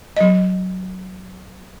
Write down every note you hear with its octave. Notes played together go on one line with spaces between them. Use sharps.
F#3 D#5